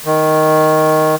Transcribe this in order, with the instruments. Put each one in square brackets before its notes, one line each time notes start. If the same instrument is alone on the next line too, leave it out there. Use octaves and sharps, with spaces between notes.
[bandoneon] D#3